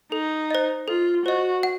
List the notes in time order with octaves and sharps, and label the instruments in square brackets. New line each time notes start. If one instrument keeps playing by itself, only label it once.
[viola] D#4 [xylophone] A4
[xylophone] C5 D#5
[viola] F4 [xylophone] A4
[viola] F#4 [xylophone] C5 D#5
[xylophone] F#5